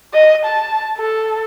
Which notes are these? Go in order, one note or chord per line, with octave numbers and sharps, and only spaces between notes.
D#5
A5
A4